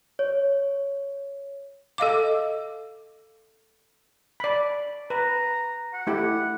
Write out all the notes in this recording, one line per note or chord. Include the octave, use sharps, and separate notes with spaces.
C#5
A4 D#5 F5 D6
D5 B5
B4 A#5
F#5
A3 E4 G4